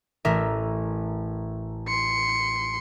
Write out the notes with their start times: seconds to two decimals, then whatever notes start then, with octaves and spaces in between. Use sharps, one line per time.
0.25 A1 A#4 E5
1.88 C6 C#7